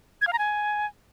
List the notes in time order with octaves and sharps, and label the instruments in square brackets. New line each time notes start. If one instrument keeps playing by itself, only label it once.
[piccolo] G#6
F5
A#5
G#5